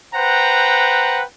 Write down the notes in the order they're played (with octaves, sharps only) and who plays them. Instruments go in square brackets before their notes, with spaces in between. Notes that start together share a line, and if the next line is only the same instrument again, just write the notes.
[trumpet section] B4 C5 F#5 G5 A#5